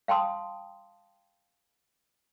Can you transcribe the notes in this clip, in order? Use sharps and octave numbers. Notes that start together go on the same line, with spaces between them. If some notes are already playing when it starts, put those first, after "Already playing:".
F5 G5 A5 C6 D#6